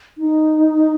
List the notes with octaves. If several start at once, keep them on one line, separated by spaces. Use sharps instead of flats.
D#4